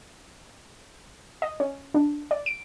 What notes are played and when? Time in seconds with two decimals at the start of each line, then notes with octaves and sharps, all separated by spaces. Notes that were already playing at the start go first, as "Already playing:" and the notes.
1.42 D#5
1.60 C#4
1.94 D4
2.31 D5
2.46 D7